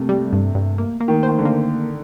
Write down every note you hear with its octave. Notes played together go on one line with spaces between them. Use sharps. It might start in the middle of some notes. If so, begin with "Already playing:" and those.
Already playing: C3 A3 A#3
G3
G2
G2
A#3
A#3
D#3
D#3 C5
D3
A#3